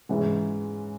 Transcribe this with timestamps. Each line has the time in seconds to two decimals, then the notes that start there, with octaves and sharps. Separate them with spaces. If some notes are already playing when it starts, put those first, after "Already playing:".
0.09 G#2 E3 G#3 C#4